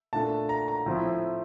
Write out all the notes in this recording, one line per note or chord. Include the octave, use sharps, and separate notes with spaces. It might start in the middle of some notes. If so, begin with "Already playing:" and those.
A#2 A3 D4 A5
A#5
A#5
A2 F3 C4 E4